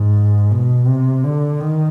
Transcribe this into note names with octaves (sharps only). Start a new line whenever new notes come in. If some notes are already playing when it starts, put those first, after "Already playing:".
Already playing: G#2
B2
C3
D3
D#3